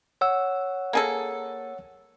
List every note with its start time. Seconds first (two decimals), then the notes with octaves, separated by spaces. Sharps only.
0.21 C#5 F#5 E6
0.93 A#3 G#4 A4